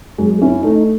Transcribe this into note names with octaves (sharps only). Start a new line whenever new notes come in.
F#2 G#3
C#4 E4
A3 D#4